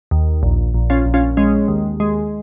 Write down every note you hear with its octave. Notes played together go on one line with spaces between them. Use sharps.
D#2
A#1
A#1
C#4 F4
A#1
C#4 F4
G#3 C#4
D#2
G#3